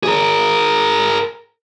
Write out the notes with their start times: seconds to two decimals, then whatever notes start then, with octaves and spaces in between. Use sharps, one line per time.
0.03 G#4 A#4